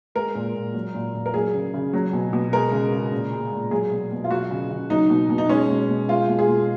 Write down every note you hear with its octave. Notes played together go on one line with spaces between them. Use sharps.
G#3 A#4
A#2
A#2
F#3
A#2
A#2
A#4
F#3 G#4
C#3
C#3
F#3
B2
B2
G#3 A#4
C#3
C#3
A#2
G#3
A#2
F#3 G#4
B2
B2
F4
F#3 F#4
C#3
C#3
F#3 D#4
B2
B2
D#4
G#3 C#4
B2
B2
G#3 F4
B2
G#4
B2